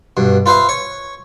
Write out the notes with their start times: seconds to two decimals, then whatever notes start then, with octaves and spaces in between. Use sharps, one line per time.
0.17 G2 B2
0.46 F4 B4 C5 E5 F5
0.69 C#5 C#6